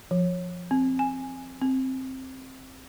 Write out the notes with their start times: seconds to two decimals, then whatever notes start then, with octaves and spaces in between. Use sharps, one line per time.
0.11 F3
0.71 C4
0.99 G#5
1.62 C4